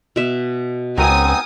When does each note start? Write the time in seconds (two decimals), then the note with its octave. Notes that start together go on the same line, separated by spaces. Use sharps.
0.16 B2 E5
0.98 C#2 B3 C4 D#4 A#4 G#5 D#6